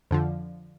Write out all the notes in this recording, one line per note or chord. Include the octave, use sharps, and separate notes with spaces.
F2 D3 F3